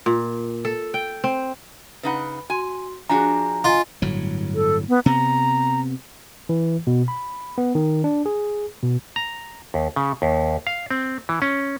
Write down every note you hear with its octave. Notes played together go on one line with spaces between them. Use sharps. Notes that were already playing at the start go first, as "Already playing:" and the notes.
A#2
A4
G5
C4
C#3 D#4 B4 F#5 B5
F#4 G#5 C6
F3 D4 F#4 G#4 G#5 A#5
F4 D#5 G#5
G1 A2 F#3
A4
B3
C3 B3 A#5
E3
B2
B5
B3
D#3
D4
G#4
B2
A#5
D#2
C#3
D#2
F5
C4
E3
C#4